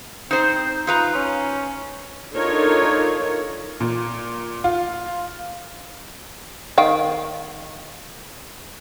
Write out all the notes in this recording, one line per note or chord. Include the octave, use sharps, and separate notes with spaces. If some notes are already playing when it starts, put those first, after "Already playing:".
C4 D#4 C5
D#4 F4 B4 A#5
C#4
D4 D#4 F4 A4 A#4 C#5
A#2
F4
D#3 F5 G5